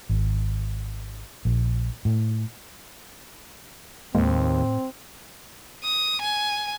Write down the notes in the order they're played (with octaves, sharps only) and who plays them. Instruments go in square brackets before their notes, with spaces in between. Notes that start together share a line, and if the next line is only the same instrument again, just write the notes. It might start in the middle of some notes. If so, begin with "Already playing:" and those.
[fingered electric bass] G#1
A#1
A2
[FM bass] D#2 [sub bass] A2 [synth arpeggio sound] G#3 A#3 [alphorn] C4
[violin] D#6
G#5